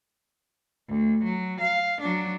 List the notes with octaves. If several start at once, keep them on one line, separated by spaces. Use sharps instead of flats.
D2
F#3
F5
F#3 D4